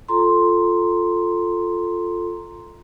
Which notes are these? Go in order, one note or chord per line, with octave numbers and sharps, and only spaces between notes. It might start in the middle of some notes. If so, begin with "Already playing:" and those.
F4 A4 A#5 C6